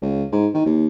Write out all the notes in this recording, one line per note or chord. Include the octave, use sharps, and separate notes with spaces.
C#2
G#2
D#3
D#2